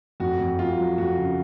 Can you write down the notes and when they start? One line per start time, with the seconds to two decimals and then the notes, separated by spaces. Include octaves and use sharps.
0.20 F2 F#4
0.40 F2
0.59 F2 F4
0.78 F#3
0.98 F2 F#4
1.18 C#3